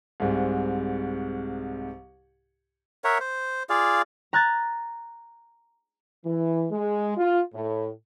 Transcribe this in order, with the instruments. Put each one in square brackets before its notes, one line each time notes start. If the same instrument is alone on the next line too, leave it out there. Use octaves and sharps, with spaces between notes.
[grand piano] C2 G#2 C3
[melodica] A#4 C#5 E5 F#5
C5
F4 G#4 D5 F5
[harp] A#5 F#6 G#6 A6
[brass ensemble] E3
G#3
F4
A2